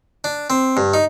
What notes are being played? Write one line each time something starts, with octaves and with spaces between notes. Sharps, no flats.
D4
C4
G2
D#4